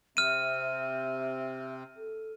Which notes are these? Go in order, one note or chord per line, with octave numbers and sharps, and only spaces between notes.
C3 C4 E5 F6 D#7
A4